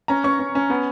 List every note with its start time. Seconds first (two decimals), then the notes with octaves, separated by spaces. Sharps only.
0.08 C#4 A#5
0.24 C#4 C#6
0.39 C#4
0.55 C#4
0.70 B3